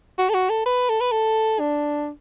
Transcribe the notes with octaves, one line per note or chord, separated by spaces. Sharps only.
F#4
A4
F#4
A4
B4
A4
B4
A4
D4